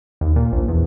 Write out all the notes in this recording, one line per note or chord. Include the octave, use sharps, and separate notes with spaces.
D#2
A#2
A#1
E2